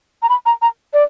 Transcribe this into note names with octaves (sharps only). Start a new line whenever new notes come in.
A#5
B5
A#5
A#5
D5